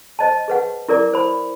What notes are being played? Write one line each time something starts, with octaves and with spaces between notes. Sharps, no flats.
C5 D#5 A5
G#4 B4 F#5
E4 A#4 D5 D6
C5 B5